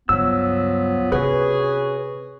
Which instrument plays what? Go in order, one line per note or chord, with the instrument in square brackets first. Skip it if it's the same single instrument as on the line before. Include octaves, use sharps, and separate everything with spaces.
[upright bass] C#2 G2 [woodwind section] F3 F#3 B3 [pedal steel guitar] E6
[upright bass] C3 [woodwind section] C#4 F#4 G#4 [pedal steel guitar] B4